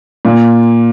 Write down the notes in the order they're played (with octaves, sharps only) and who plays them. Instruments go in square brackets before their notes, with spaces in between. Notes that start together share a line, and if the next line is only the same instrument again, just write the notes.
[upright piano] A#2